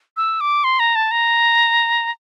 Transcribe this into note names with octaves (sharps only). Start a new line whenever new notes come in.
E6
D6
C6
A#5
A5
A#5